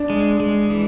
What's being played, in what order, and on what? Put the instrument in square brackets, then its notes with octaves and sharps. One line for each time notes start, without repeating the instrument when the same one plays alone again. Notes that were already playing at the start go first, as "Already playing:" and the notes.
Already playing: [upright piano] D4
[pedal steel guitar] G#3
G#3
E3